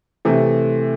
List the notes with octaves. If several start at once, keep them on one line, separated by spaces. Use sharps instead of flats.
C3 E3 A3